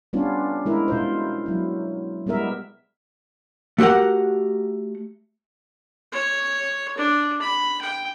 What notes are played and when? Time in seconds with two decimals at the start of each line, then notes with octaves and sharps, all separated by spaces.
0.13 G3 B3 C#4 D4 F4
0.66 G#3 E4 A#4
0.88 B2 F4 C5
1.46 F#3 E4
2.27 G3 G#3 B3 A#4 E5
3.78 A3 F#4 G4 A#4 F#5
6.12 C#5
6.98 D4
7.42 B5
7.81 G5